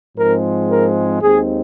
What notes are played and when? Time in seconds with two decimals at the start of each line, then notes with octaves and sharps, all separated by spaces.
0.17 G#2 F3 G#3 C4 A#4
0.69 A#4
1.21 D#2 D#3 G#3 C4 G#4